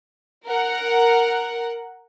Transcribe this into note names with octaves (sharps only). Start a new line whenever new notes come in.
A#4 F#5